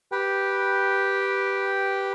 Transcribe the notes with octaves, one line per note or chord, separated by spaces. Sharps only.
G4 B4 G5